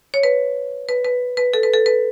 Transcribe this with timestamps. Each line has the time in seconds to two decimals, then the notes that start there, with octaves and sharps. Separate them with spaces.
0.14 C#5
0.23 B4
0.89 B4
1.05 B4
1.37 B4
1.54 A4
1.63 B4
1.73 A4
1.86 B4